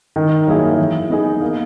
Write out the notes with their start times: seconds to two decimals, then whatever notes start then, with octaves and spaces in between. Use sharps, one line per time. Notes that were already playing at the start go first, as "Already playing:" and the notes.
0.16 D#3
0.47 F#3 A#3 E4 G#4
0.78 E3
1.10 B3 D#4 G#4
1.41 A#3